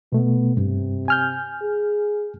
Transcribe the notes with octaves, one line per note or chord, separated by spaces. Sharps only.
B2 A3 B3
G2 C3
G#5 F6 G6
G#4